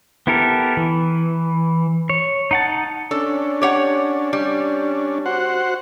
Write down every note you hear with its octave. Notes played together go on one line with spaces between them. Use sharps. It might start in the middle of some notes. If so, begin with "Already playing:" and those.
B3 E4 G4 A4 A#4
E3
C#5
D#4 F#5 A5
C#4 D4 A4
G4 C#5 F#5
G3
F#4 C5 F#5